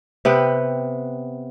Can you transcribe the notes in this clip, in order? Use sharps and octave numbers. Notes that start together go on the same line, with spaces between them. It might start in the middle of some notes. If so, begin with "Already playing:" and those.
C3 B3 B4 G5